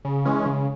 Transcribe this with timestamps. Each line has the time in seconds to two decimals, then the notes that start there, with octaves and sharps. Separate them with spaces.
0.05 C#3
0.25 E3 G#3 C#4
0.46 C#3